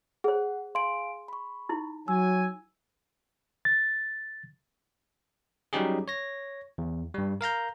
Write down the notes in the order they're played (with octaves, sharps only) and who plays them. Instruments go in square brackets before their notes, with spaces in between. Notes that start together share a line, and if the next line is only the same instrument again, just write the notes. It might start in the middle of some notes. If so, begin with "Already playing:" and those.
[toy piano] G#4 C5 [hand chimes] F#5
[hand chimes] F5 G#5 D7 [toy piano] C6
[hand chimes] B5 C#6
[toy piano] D#4 E4
[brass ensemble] F#3 G#5 [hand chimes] E6
[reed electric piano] A6
[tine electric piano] F#3 G3 C#4 D#4 G4 G#4
C#5 A#6
E2
G2 G3
A#4 F5 A#5 G6